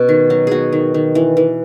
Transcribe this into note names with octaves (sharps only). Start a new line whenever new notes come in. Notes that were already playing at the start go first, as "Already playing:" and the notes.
Already playing: B2 C#4
D#3
F#3
B3 F#4 G#4
D#3
D#3
E3
E3